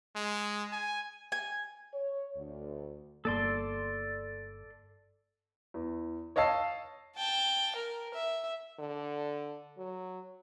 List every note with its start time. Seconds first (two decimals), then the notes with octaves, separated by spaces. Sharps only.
0.15 G#3
0.73 G#5
1.32 G#5
1.94 C#5
2.36 D2
3.25 G1 A#3 A4 D5 C6
5.74 E2
6.36 C#5 D#5 F5 A5 E6 C7
7.17 G5 A5
7.76 A#4
8.14 E5
8.79 D3
9.78 F#3